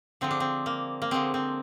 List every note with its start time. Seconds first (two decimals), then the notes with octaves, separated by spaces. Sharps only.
0.21 D3 F3 G#3 C4
0.31 D4
0.40 C4
0.66 A#3
1.02 A#3
1.11 D3 F3 G#3 C4
1.34 C4